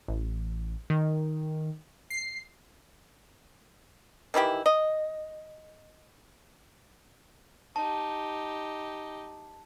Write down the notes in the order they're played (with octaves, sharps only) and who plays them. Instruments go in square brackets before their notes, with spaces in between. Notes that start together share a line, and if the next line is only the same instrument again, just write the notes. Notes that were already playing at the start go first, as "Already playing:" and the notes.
[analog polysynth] A1
D#3
C7
[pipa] D#3 E3 E4 G4
D#5
[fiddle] D#4 G4 [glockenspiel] A5